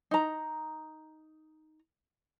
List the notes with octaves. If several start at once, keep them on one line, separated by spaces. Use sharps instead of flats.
D#4 A#5